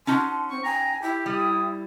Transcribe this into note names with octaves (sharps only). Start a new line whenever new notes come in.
C#4 D#4 F#4 A5 C6
C4 C#6
G5 G#5 A#5
E4 G4 G5
G3 D#6